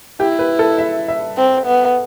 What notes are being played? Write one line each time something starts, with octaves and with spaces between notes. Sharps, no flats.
E4 G4
B4
A4
E5
E5
C4
B3